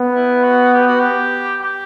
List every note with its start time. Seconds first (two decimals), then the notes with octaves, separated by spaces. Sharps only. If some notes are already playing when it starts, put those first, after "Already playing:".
Already playing: B3
0.15 E4
0.44 F#4
0.74 G4
0.87 F#4
1.00 G4
1.62 G4